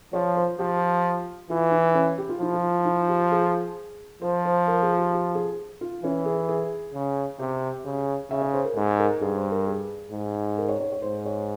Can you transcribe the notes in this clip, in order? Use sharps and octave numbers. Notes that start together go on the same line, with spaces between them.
F3 C#5
C5
F3 G4
E3 F4
E4
C#4
G4
F4
F3 E4
F4
E4
G4
G#4
F3 C5
C5
A#4
G#4
G4
G4
G#4
F4
E3 C#4
G#4
G#4
C#3
C3 G4
C#3
C#3 E5
C#5
C5
A#4
G#2 G#4
A#4
G2 G#4
C5
A#4
G#4
G#2
A#4
C#5
C#5
C#5
G#2 C5
C#5